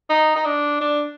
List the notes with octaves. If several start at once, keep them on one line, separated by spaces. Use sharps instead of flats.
D#4
D#4
D4
D4